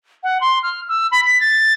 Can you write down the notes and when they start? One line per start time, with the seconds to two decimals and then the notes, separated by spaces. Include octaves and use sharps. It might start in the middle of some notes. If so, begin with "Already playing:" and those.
0.23 F#5
0.41 C6
0.63 F6
0.89 E6
1.12 B5
1.26 B6
1.40 A6